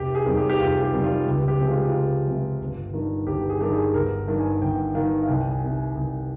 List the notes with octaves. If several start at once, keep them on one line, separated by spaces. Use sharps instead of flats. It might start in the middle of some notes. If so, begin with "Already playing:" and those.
Already playing: F1 G4
G#4
F2 D#3 G3
G4
G4
F1 F4
G4
F2 D#3 G3
F4
C#2 G4
G4
C3 F3 G#3
F4
G4
C#2 F4
C3 F3 G#3
G1
G2 D#3
G1 G4
G#4
G2 D#3 G4
G#4
G1 A#4
G2 D#3
G#5
G1 G5
G2 D#3 F5
F5
C2 G5
G#5
C3 D#3
G#5
C2 G#5